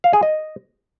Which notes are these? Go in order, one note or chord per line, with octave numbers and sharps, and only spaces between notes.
F5
G#4
D#5